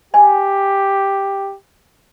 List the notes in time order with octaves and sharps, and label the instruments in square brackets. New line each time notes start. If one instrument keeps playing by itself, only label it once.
[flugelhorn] G4 [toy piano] D#5 G#5